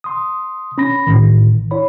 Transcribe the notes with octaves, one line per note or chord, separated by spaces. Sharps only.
C6 D#6
C#4 B5 A#6
A1 A2 D#3
E4 C#5 B5